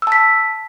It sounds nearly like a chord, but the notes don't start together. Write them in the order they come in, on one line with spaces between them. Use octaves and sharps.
E6 A5 B6